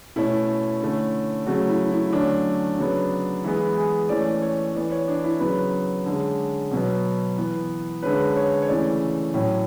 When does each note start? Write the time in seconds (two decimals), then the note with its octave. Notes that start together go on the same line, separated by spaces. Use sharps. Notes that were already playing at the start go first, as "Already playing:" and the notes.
0.16 B2 A3 C#4 E4
0.81 D3 A3 C#4
1.46 C#3 F#3 A3 F#4
1.69 E4
1.91 E4
2.13 D3 F#3 A3 C#4 D4
2.78 C#3 F#3 B3
3.44 E3 G#3 B3 E4
3.77 G#4
4.09 E3 A3 C#4 D5
4.42 C#5
4.75 E3 B3 D5
4.91 C#5
5.08 D4
5.24 E4
5.40 C#3 F#3 B3 B4
6.06 D3 G#3 C#4
6.71 B2 F#3 B3
7.37 E3 B3
8.02 D3 G#3 C#4 B4
8.36 C#5
8.62 C#5
8.68 C#3 E3 A3 C#4 D5
9.34 A2 F#3 C#4